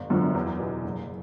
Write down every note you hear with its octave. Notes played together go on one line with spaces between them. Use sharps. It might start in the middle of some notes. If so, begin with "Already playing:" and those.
Already playing: G1
F#2 D3 F3
E2
B2
F#1